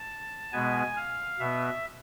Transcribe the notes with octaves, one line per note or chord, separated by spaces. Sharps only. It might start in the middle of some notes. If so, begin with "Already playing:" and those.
Already playing: A5
B2 G#3 B3 G#5
F5
B2 B3 E5